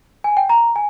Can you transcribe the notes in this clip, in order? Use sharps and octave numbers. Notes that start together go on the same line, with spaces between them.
G#5
G5
A#5
G#5